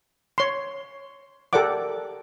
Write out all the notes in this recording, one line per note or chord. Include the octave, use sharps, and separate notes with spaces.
C#5 C6
G4 A4 A#4 D5 F#5 D6